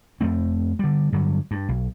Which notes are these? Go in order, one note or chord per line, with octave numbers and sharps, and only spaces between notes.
F2 A3 C4
D3 G3
G2 D3 F#3
G2
B1